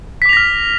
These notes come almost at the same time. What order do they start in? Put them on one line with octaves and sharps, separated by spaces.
B6 D6 F7 A#6 F6